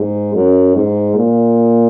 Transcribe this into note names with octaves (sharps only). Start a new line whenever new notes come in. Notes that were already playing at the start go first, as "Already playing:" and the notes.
Already playing: G#2
F#2
G#2
A#2